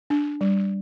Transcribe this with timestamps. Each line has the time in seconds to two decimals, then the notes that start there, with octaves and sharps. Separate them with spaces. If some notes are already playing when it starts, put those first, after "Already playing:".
0.10 D4
0.41 G3